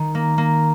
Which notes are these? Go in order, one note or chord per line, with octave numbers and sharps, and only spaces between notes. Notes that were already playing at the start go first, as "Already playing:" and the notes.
Already playing: D#3
A#3
A#3